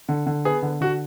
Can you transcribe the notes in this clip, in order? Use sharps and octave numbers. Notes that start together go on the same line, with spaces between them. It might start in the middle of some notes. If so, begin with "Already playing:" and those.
D3
D3
B3 G#4
D3
D3 F#4